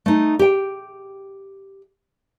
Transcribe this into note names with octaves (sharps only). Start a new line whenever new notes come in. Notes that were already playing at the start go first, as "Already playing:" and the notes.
A3 D#4
G4 G5